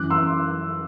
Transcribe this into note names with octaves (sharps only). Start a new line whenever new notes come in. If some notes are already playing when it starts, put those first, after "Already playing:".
Already playing: F#2 E3 D6 F#6
C6 E6